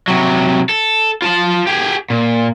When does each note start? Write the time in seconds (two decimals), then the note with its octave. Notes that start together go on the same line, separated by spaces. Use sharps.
0.08 C3 F#3
0.69 A4
1.22 F4 A5
1.67 G4 G#4
2.10 A#2